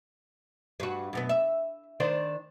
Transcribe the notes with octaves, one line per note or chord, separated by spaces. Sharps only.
G2 F#4
F#2 B2 B3
E5
D#3 D4 C5